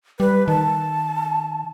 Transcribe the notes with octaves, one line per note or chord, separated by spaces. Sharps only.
G3 B4
D#3 A5